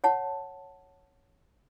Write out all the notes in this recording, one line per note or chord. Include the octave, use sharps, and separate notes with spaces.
C#5 F#5 A5